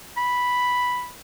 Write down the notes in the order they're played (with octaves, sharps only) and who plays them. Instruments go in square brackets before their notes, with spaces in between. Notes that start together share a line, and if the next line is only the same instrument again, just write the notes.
[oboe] B5